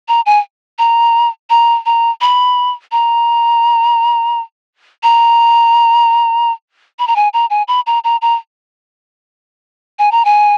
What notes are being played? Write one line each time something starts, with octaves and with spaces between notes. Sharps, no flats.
A#5
G#5
A#5
A#5
A#5
B5
A#5
A#5
B5
A#5
G#5
A#5
G#5
B5
A#5
A#5
A#5
G#5
A#5
G#5